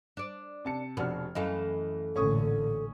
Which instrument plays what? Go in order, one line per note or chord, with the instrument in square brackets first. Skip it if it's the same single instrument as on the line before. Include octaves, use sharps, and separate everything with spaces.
[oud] D4 D5
[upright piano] C3 A5 C#7
[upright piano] F1 D4 F6 [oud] B2
[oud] F#2 E3 A3 [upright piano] D#5 F5
[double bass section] A1 A#2 D3 [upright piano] C#4 C#6 D#6 [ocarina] A4